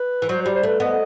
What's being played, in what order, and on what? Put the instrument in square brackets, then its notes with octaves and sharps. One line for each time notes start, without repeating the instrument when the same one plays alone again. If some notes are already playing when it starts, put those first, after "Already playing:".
Already playing: [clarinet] B4
[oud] E3
[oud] F#3 [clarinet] C5
[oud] G3 [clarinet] C5
[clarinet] C5
[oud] A3 [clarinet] B4
[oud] B3 [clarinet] D#5